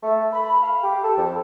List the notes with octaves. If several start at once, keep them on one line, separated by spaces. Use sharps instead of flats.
A3
B5
F5
G4
A4
F2